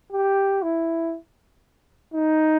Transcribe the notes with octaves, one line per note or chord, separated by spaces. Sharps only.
G4
E4
D#4